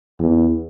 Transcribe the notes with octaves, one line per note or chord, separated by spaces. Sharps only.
E2